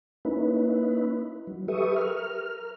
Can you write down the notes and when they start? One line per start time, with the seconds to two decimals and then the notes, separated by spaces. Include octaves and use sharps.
0.25 A#3 C#4 D#4 E4 B4
1.47 F#3
1.68 G4 A4 B4 E5 C#6 D#6
1.96 A#4 F6